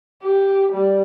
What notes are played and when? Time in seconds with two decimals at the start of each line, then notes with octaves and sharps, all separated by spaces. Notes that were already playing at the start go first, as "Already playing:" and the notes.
0.23 G4
0.73 G3